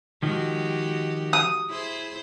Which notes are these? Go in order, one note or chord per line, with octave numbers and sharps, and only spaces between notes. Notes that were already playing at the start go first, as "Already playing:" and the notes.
D#3 F3 G#3 F#4 G4
D#6
E4 G#4 C5